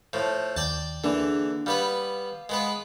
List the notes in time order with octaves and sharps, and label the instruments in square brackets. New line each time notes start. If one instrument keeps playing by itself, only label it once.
[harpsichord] A2 F3
[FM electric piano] D#2 [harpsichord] D5 G5 A5
[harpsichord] D3 E3 [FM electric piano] A#3 D4 G#4
[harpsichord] G3 B3 B4 [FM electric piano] F5
[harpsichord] G#3 B3 B4